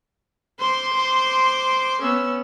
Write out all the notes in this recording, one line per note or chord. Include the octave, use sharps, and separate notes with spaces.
C5 C6 D6
C5
B3 C#4 E6